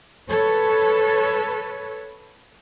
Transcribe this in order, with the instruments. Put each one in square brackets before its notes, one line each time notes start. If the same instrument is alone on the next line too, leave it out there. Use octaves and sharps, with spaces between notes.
[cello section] A4 B4 C#5